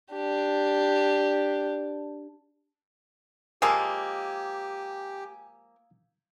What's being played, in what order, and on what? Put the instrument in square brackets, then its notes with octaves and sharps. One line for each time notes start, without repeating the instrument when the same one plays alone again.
[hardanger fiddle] D4 G4
[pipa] F3 G#3 A#3 [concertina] G4 [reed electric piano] F5 D#6 E6 [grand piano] G#5